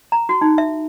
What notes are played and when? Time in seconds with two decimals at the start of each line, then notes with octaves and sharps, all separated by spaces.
0.12 A#5
0.29 F#4
0.41 D#4
0.58 E5